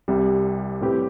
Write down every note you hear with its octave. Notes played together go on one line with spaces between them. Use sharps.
C2 C3 G3
A2 G3 C4 G4 B4